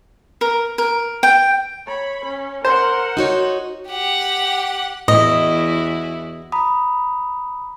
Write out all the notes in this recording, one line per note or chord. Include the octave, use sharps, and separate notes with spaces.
A#4
A#4
G5
C#5 B5
C#4
A#4 C5 F#5
D#4 F#4 C#5
G4 F#5
E2 A2 E4 F#4 D#5
A#5 B5 D#6